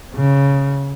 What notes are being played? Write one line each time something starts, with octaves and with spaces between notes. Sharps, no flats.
C#3